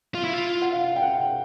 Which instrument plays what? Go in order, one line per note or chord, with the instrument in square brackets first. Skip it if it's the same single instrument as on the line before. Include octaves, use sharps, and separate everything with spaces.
[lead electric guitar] F4 [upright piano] F5
[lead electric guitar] E4
F4
[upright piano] F#5
F5
G5
F#5